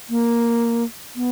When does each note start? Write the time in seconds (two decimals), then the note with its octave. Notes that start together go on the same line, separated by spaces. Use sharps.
0.10 A#3
1.16 B3